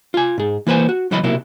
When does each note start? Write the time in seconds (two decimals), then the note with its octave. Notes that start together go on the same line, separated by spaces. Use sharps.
0.14 F4 G#5
0.38 G#2 G#4
0.67 E3 A#3 B4 C5 G#5
0.89 F#4
1.11 C#2 E3 F#3 E4 D#5 B5
1.24 B1 C3 F#3 A#3 E4